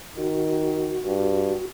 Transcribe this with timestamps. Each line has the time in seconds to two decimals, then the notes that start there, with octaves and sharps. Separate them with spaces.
0.17 D#3 F#4
1.05 G2